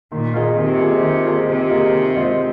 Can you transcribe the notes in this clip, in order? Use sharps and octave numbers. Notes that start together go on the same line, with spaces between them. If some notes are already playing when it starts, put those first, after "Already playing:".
A#2 D#3
A#3 F4 G#4 D#5
C3 D#3
A#3 F4 G#4 D#5
D#3
A#3 F4 G#4 D#5
C3 D#3
A#3 F4 G#4 D#5
D#3
G#3 F4 C5 D#5